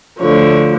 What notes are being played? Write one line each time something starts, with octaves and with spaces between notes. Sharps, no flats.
D2 D3 F3 C#5